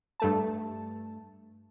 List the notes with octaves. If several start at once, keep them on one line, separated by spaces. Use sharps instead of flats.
G2 A3 A5